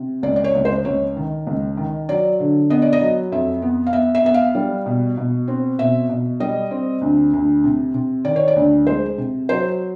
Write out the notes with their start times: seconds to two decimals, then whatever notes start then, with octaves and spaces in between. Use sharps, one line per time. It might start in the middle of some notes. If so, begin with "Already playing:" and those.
Already playing: C3
0.23 C#2 D5
0.36 D5
0.44 C#5
0.55 C#2
0.65 C5
0.85 C#2 C#5
1.16 D#3
1.47 C#2
1.77 D#3
2.09 F#3 D5
2.40 D3
2.70 B3 D#5
2.82 D5
2.93 D#5
3.00 F#3
3.32 F2 E5
3.62 B3
3.87 F5
3.93 B3 E5
4.15 E5
4.25 B3 E5
4.34 F5
4.55 G3
4.86 B2
5.17 B2
5.48 C4
5.79 B2 E5
6.09 B2
6.40 G3 D#5
6.71 C4
7.01 D2
7.33 D2
7.64 C3
7.94 C3
8.25 D#3 D5
8.36 C#5
8.48 D5
8.56 D2
8.87 G#3 C5
9.18 C3
9.49 F#3 C5